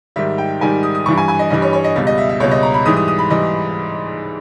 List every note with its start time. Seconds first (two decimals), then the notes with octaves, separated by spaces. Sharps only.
0.16 G#2 D#3 G3 E5
0.38 G5
0.61 G#2 D#3 G3 G#5
0.83 D#6
0.95 D#6
1.06 G2 E3 G3 C#6
1.17 G#5
1.28 G#5
1.39 D#5
1.50 G2 E3 G3 D#5
1.62 C#5
1.73 C#5
1.84 D#5
1.96 C#2 B2 G3
2.07 D#5
2.18 E5
2.29 E5
2.40 C#2 B2 G3 C#5
2.51 D#5
2.63 A#5
2.74 B5
2.86 G#2 E3 G3 D#6
2.97 D#6
3.08 D#6
3.19 B5
3.30 E3 G3 D#5